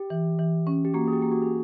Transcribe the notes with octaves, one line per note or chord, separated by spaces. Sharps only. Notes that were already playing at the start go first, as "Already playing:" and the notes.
Already playing: G4
E3
E3
C#4
G4
A#3 F#4
G#4
G4
A#3
F#4
G#4